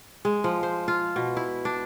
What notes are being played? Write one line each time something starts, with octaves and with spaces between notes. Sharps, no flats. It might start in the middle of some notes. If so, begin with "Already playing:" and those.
G#3
F3
C5
F4
B2
E4
D4